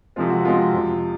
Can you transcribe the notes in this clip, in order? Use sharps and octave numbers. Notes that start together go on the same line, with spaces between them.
C3 F3 G#3 C4 F4
F#4
F#4
C3 F3 G#3 C4 F4
F2 C3 F3